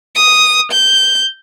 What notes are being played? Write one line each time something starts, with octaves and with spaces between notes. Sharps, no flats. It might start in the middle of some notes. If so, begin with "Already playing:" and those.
D#6
G6